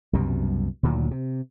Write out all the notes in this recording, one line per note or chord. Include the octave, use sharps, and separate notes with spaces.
C2 F#2 B2 G3
D2 A#2 D#3 F#3
C3